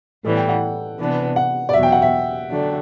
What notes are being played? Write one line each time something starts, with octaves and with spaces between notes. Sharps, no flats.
A2 E3 G3 B3 A4
G5
F#5
C3 E3 B3 D4
F#5
D5
E2 B2 F#3 E5
G5
F#5
E5
D3 F#3 A3 D4